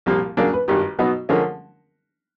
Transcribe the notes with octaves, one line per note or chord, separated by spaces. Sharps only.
C2 A#2 F3 A#3 G4
C#3 F#3 A#3 D4 A#4
B4
G#1 G2 D#3 G4
B2 F#3 B3 D#4 F#4
D3 F3 G#3 C#4 A#4